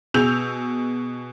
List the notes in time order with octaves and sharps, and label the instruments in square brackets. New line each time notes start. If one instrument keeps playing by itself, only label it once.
[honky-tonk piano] B2 G#4 E6 G6 F7